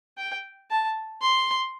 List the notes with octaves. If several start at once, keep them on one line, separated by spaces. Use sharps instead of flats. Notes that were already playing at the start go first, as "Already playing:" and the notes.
G5
A5
C6